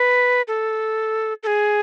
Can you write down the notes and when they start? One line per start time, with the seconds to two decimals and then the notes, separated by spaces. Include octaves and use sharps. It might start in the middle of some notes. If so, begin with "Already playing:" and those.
Already playing: B4
0.48 A4
1.43 A4
1.47 G#4